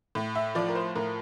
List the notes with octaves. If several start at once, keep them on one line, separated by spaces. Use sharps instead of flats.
A2
E5
F3 D5
A#4
C5
A2 A#4